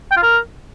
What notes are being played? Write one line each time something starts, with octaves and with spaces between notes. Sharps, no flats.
G5
F4
A#4